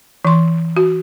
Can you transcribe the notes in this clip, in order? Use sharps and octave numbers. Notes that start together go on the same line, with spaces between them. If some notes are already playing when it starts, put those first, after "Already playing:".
E3 C6
F#4